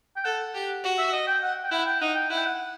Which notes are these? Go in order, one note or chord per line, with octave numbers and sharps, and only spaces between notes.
G5
A4 F#5
G4
F#4
E5
D#5
G5
F#5
G5
E4 F#5
G5
D#4 F#5
G5
E4 F#5
G5
F#5